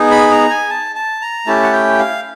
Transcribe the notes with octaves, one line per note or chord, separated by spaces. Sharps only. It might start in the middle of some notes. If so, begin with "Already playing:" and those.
Already playing: B3 D#4 G#4
B5
A#5
G#5
A5
A5
A#5
A3 C#4 E4 G4 A5
F#5
G5
F5